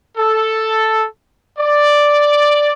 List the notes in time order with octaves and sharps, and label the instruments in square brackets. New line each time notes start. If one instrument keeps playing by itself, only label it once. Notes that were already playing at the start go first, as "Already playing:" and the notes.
[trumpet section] A4
D5